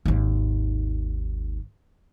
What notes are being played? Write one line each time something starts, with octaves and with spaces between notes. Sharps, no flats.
G#1 D#2